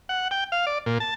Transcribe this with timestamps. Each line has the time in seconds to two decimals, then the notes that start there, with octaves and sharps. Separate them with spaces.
0.09 F#5
0.31 G5
0.52 F5
0.67 D5
0.86 A#2
1.00 A5